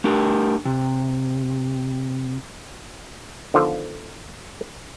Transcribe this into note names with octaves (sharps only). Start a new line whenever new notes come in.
A3 D4 G4 A#4
C3
D3 D#3 F3 B3 F4 A4